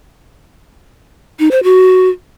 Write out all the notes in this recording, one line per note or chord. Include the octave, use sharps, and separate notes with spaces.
D#4
C5
F#4